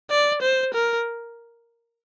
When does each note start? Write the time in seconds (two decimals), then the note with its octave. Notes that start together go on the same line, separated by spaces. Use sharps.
0.11 D5
0.42 C5
0.74 A#4